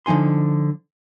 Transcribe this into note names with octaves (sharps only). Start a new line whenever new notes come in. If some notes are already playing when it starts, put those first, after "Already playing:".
D3 F3 D#4 G#5 C6